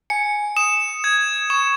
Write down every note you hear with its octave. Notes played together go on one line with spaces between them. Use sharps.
G#5 C#7
D#6 E7
D#6 G#6
C#6 E7